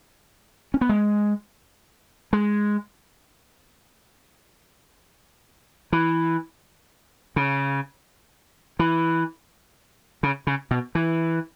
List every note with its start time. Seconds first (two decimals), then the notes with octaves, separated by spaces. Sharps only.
0.74 C#4
0.81 B3
0.89 G#3
2.33 G#3
5.92 E3
7.36 C#3
8.79 E3
10.23 C#3
10.47 C#3
10.71 B2
10.95 E3